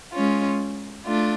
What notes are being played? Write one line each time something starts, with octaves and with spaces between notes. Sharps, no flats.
G#3 C#4 F4
A3 D4 F4